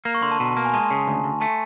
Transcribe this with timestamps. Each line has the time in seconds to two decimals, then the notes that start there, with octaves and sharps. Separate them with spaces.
0.05 A#3
0.15 C#6
0.22 D3 C6
0.31 A5
0.40 B2 A#5
0.57 A#3
0.65 G#5
0.74 G#3 A5
0.91 C#3
1.07 D2
1.24 D2
1.41 A3 A5